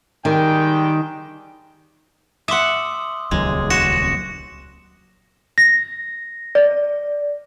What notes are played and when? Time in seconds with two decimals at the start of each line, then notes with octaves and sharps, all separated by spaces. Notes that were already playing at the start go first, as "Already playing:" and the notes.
0.25 D#3 G3 G#3 G5
2.48 E5 F#5 C6 D6 D#6
3.31 D#1 C#2 F#3 G#3
3.70 F#4 A#6 C#7 E7
5.58 A#6
6.55 D5